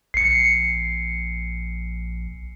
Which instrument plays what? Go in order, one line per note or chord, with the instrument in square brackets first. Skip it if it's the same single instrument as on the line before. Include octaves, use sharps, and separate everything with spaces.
[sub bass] A#1 [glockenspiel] C7 C#7